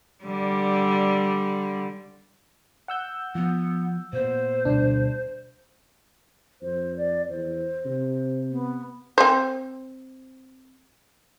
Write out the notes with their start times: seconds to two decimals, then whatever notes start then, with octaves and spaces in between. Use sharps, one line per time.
0.24 D3 G3
2.88 F#5 E6 G6
3.35 F3 B3
4.13 A#2 B3 C5
4.65 D2 B2 G3 D4
6.62 F2 C5
6.97 D5
7.29 E2 C5
7.85 C3
8.51 B3
9.18 C4 C5